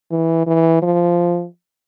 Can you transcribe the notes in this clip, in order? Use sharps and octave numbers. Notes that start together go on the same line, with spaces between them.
E3
E3
F3